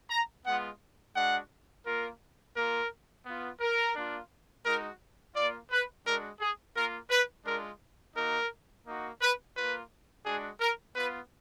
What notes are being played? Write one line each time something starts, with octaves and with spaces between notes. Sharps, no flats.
A#5
G#3 B3 F4 F#5
G#3 D4 F#4 F#5
A#3 F4 A#4
A#3 F4 A#4
B3 F4
A#4
A#3 D4 F4
G#3 D#4 F#4 A#4
A#3 F4 D5
B4
G#3 D4 F#4 A#4
G#4
A#3 F4 A#4
B4
G#3 D4 F4 A#4
A#3 D#4 F#4 A#4
A#3 D#4 F#4
B4
A#3 F4 B4
G#3 D4 F#4 G#4
A#4
B3 F4 B4